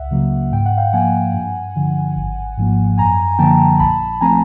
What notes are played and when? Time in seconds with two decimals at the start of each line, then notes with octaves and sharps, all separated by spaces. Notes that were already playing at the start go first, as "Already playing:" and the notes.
Already playing: C#2 E5 F#5
0.11 C#3 F#3 A#3
0.52 G#2 G5
0.66 F#5
0.77 F5 G5
0.93 F3 A#3 F#5 G#5
1.34 G2
1.76 D3 F3
2.16 G#1
2.57 G#2 F3 A#3
2.98 F#2 G#5 A#5
3.39 D3 F3 A#3 G5 A5
3.80 A#1 A5 B5
4.21 F3 A3 C4 G#5 A#5